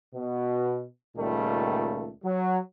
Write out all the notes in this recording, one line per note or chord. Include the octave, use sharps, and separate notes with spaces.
B2
C#2 A#2 D#3 G3 A3
F#3